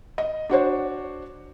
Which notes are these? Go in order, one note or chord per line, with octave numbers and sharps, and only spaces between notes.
D#5
D4 F#4 C5 C#5